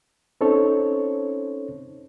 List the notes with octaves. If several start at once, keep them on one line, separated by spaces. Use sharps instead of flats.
C4 C#4 D#4 A4 C5 C#5